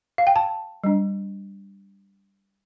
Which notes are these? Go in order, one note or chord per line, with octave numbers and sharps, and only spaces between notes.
F5
G5
A5
G3 D4